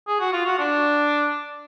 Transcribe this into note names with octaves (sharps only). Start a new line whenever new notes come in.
G#4
F#4
F4
F#4
D4